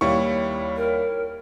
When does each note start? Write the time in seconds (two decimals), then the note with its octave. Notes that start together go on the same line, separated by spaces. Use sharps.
0.01 D#2 G3 E4 C#5 C#6
0.77 A#4